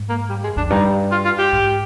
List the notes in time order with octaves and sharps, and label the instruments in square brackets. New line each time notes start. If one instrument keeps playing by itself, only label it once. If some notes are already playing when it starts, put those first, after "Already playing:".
Already playing: [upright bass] G#2
[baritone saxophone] A#3
G3
G#3
[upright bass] F2 [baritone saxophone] D4
[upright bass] G2 [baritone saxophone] D#4
[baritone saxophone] F4
F4
G4
[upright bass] G#2